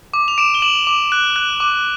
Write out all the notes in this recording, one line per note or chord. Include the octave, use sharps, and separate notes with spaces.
D6
F7
D6 D7 E7
G7
D6 E7 F#7
D6
F#6
F#6
D6